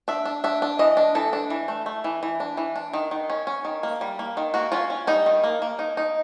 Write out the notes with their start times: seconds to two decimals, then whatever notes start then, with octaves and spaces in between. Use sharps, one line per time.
0.08 D4 E5
0.25 D4
0.44 D4 E5
0.62 D4
0.79 E3 D#5
0.97 D4
1.15 E3 A4
1.33 D4
1.50 E3
1.68 A3
1.86 A3
2.04 E3
2.23 E3
2.40 D4
2.57 E3
2.76 D4
2.93 D#3
3.11 D#3
3.30 C#4
3.47 C#4
3.65 D#3
3.83 A#3
4.01 G3
4.19 A#3
4.37 D#3
4.54 A#3 F#4
4.72 C#4 F4
4.90 C#4
5.07 G3 D#4
5.26 D#3
5.44 A#3
5.62 A#3
5.79 D#4
5.97 D#4